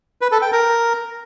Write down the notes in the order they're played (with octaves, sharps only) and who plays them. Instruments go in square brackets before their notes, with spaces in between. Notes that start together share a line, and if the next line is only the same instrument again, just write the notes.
[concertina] B4
A4
G5
A#4